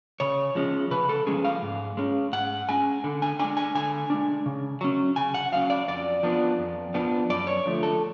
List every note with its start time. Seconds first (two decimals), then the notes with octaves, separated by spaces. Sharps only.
0.20 C#3 C#5
0.55 F3 G#3 C#4
0.91 C#3 B4
1.09 A4
1.27 F3 G#3 C#4 G#4
1.45 F5
1.62 G#2
1.97 G#3 C#4
2.33 G#2 F#5
2.69 G#3 C#4 G#5
3.04 D3
3.22 G#5
3.39 G#3 D4 G#5
3.57 G#5
3.75 D3 G#5
4.10 G#3 D4
4.46 C#3
4.81 F#3 C#4
5.16 C#3 G#5
5.34 F#5
5.52 F#3 C#4 F5
5.70 D5
5.88 F2 D5
6.23 F3 B3 D4
6.58 F2
6.94 F3 B3 D4
7.30 F#2 D5
7.47 C#5
7.65 D3 F3 A3
7.83 A4